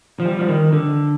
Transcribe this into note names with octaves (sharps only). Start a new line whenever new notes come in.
F3
G3
F3
D#3
D3